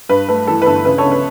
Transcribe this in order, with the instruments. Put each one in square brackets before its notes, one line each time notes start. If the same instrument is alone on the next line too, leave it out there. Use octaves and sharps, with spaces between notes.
[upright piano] G2 B4
A3 B4
E3 A4
B4
G1 A4
C#3 B4
A4 C#5
C#2
B4